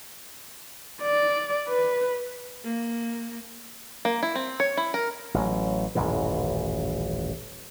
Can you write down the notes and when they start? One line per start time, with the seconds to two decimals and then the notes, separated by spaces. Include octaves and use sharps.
1.02 D5
1.68 B4
2.64 A#3
4.05 A#3
4.23 E4
4.35 C4
4.60 C#5
4.77 E4
4.94 A#4
5.34 A1 F#3
5.95 D#1 A1 F#2 E3